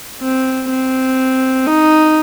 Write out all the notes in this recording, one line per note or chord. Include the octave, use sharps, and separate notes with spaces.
C4
C4
D#4